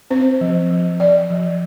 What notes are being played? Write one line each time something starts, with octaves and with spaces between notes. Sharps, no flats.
C4 C5
F3
F3
F3 D5
F3